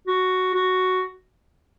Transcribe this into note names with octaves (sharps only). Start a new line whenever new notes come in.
F#4
F#4